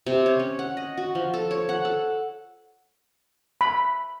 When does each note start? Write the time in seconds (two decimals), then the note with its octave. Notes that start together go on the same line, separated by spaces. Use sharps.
0.06 C3
0.26 C#5
0.39 C#4
0.59 F#5
0.77 D#5
0.97 F#4
1.15 F3
1.34 A4
1.51 C#5
1.69 F#5
1.85 A4
3.61 B5